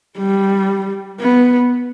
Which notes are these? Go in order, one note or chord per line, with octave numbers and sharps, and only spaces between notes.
G3
B3